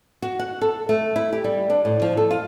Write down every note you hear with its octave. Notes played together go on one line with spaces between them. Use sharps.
F#4
F#5
A4
A3
E4
G4
G3
D4
A2
F3
A4
F4